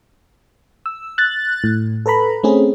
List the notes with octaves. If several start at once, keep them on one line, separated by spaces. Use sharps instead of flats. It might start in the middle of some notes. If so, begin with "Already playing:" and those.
E6
F#6 A6
A2
A4 B4 A#5 B5
A3 C4 C#4 G#4